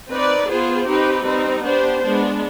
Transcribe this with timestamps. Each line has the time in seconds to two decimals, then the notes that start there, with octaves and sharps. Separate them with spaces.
0.10 C4 D#4 B4 D5
0.48 B3 F4 G#4 C5
0.87 C4 D#4 G4 B4
1.25 G3 C4 D#4
1.64 B3 D4 G4 C5
2.03 G#3 B3 D4